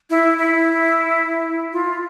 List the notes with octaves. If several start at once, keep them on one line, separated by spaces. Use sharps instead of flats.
E4
E4
F4